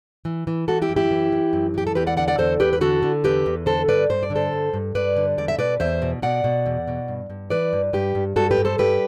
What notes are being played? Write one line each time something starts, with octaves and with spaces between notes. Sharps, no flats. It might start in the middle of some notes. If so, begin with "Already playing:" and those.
E3
E3
E3 F#4 A4
E4 G4
F#2
E4 G4
E3
E3
F#2
E3 G4
A4
E2 G4 B4
D5 F#5
D3 D5 F#5
D5 F#5
E2 A4 C5
E2 G4 B4
B4
D3 F#4 A4
D3
E2 G4 B4
E2
D3 A4 C5
G2 B4 D5
G2 C5
D5
D3
A4 C5
G2
G2
G2 B4 D5
D3
E2 D5
E5
B2 B4 D5
E2 C5 E5
B2
B2 D5 F#5
B2
E2
B2
G2
G2
E3 B4 D5
G2
G2 G4 B4
G2
G2 F#4 A4
G4 B4
G2
A4 C5
G2 G4 B4